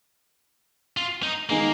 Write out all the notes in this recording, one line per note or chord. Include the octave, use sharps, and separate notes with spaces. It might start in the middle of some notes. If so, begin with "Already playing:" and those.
F4
D#4
D#3 G#3 A#3 B3 D#4 G#4